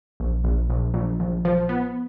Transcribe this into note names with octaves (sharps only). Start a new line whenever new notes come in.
A#1
A#1
A#1
A#1
A#1
F3
B3